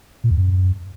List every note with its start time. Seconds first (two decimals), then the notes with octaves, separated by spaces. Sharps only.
0.24 A#2
0.30 E2
0.37 F#2